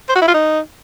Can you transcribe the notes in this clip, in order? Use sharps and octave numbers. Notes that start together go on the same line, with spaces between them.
C5
F#4
E4
F4
D#4